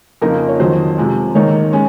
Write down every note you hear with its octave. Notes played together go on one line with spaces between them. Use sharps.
F2 C#3 F3 A#3 D#4 A#4
C#5
F2 D#3 F#3 C5
C3 F3 G#3
G#2 D#3 A#3 D#4 C#5
G#3 C#4